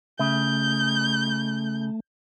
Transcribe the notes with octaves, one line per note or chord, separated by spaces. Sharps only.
C#3 A3 G6